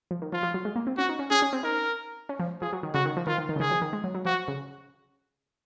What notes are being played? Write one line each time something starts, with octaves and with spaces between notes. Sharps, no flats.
F3
D#3
F3 F4
F3
F#3
G#3
A#3
C4
C#4 F#4
D#4
C#4
C#4 G#4
C#4
C4
D#4 A#4
C#4
F3
F3 G#4
F#3
D#3
C#3 F#4
D#3
F3
D#3 F4
D#3
D#3
C#3
D#3 G#4
F3
D#3
G#3
F#3
F#3
F3 F#4
C#3